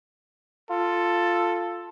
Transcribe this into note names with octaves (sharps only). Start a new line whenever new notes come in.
F4 A4